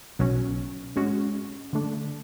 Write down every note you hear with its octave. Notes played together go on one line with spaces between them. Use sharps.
B1 B2 F#3 C#4
G#2 G#3 C#4 F#4
D3 A3 D4